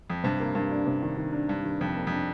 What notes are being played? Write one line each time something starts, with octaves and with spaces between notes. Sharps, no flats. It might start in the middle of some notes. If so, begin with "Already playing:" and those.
F2
G2 C3
A#3
G2 A#3
D4
C3
D#3
D#3
D4
G2 D4
D#3
F2 C3
A#3
F2
D4